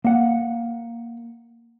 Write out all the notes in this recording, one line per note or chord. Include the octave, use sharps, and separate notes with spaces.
A#3 F#5